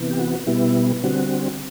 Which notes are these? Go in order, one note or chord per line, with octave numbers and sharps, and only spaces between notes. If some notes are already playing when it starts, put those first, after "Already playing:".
Already playing: C3 E3 B3
G4
F#4
B2 G3 B3 E4
D3 G3 C4 F#4